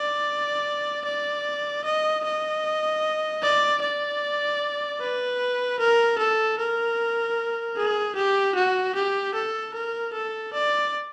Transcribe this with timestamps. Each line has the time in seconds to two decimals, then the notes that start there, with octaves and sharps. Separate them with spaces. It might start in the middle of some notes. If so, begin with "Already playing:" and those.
Already playing: D5
1.05 D5
1.85 D#5
2.24 D#5
3.42 D5
3.82 D5
5.01 B4
5.79 A#4
6.18 A4
6.59 A#4
7.77 G#4
8.15 G4
8.55 F#4
8.95 G4
9.35 A4
9.74 A#4
10.13 A4
10.53 D5